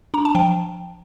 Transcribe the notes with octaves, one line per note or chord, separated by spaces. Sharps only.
D4 A#5
A5
F3 G5